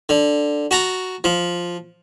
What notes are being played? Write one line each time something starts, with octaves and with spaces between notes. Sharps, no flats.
D3
F#4 A5 A#5
F3